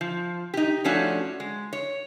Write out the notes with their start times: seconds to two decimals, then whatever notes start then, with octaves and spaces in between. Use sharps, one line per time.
0.01 F3
0.54 D#4 G4
0.84 F3 A3 C#4 D4 F#4
1.40 G#3
1.73 C#5